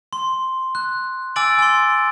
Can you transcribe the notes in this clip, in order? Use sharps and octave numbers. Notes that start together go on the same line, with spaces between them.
C6
F#6
G#5 D6 E6 A6 D7 F#7
G#5 C6